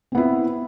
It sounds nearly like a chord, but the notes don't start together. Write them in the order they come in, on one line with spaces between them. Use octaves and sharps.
C4 B3 E4